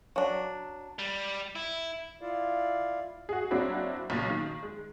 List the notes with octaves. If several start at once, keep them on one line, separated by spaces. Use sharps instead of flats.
F#3 D4
G3
E4
E4 F4 D5 F5
F#4 G#4
F#3 A#3 C4 D4 E4 F#4
B1 A#2 C#3
D#3
G#3